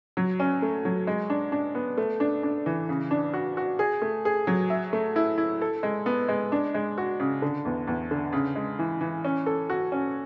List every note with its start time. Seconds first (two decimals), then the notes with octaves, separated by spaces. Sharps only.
0.17 F#3
0.40 C#4
0.62 A3
0.85 F#3
1.07 G#3
1.30 D4
1.52 D4
1.75 B3
1.97 A3
2.20 D4
2.43 D4
2.66 E3
2.89 C#3
3.11 D4
3.34 F#4
3.57 F#4
3.79 G#4
4.02 A3
4.25 G#4
4.47 F#3
4.70 E5
4.93 A3
5.16 E4
5.38 E4
5.61 A4
5.83 G#3
6.06 B3
6.29 G#3
6.52 D4
6.74 G#3
6.98 F#4
7.20 C#3
7.42 D3
7.65 E2
7.87 E2
8.11 D3
8.33 C#3
8.56 G#3
8.79 E3
9.01 E3
9.24 C#4
9.46 A4
9.70 F#4
9.92 C#4